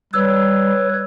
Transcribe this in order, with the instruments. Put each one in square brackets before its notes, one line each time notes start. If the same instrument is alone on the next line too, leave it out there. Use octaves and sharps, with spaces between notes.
[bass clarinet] G3 [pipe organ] B4 C#5 [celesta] E6